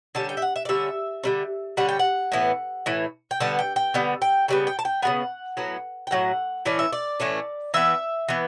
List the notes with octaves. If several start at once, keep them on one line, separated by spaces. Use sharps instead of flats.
D3 G3 C#4 A5
G5
E5
F#5
E5
D5
D3 G3 C#4 E5
D3 G3 C#4
D3 G3 C#4 F#5
G5
F#5
A2 E3 B3
A2 E3
G5
D3 G3 B3 A5
G5
G5
D3 G3 B3
G5
C#3 G3 B3 G5
G5
A5
G5
C#3 G3 B3 F#5
A2 F#3 B3
G5
A2 F#3 F#5
A2 E3 A3 C#4 D5
E5
D5
A2 E3 A3 C#4
E3 B3 E5
E3 B3